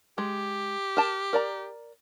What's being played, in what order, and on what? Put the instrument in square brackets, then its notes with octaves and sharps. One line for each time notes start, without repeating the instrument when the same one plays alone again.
[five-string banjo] G#3 [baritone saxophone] G4
[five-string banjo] A#4 A5
A#4 D5 A#5